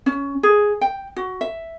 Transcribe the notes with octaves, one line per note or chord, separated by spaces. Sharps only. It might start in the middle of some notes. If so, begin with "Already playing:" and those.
C#4
G#4
G5
F#4
E5